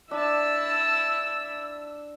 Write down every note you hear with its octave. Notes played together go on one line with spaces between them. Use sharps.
D4 E4 A5 E6